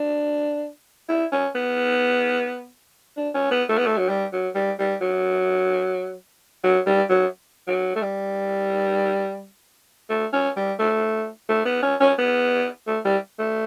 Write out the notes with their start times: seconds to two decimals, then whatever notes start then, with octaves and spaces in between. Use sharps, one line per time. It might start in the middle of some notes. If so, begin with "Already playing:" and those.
Already playing: D4
1.09 E4
1.32 C#4
1.55 B3
3.17 D4
3.34 C#4
3.51 B3
3.69 A3
3.78 B3
3.86 A3
3.97 F#3
4.09 G3
4.32 F#3
4.55 G3
4.79 G3
5.01 F#3
6.64 F#3
6.86 G3
7.10 F#3
7.67 F#3
7.95 A3
8.02 G3
10.10 A3
10.33 C#4
10.56 G3
10.79 A3
11.49 A3
11.65 B3
11.83 C#4
12.00 C#4
12.18 B3
12.87 A3
13.05 G3
13.39 A3